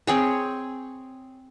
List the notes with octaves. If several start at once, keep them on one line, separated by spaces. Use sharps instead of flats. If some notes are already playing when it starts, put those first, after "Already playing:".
C4 G#4 C#5